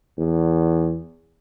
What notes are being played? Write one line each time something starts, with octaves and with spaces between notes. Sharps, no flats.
E2